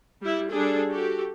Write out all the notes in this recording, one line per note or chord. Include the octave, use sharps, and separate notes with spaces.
G3 E4
G3 D4 G#4 A4
F#4 G4 A4